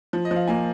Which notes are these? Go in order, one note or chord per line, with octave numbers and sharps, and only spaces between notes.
F3
D#5
F3
F5
A#3 G#5